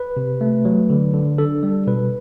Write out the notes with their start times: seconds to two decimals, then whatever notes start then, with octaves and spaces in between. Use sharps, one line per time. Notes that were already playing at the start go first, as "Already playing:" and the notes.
Already playing: B4
0.17 C3
0.41 A3
0.65 F#3
0.90 D3
1.14 D3
1.38 D4 A4
1.63 G3
1.87 B2 B4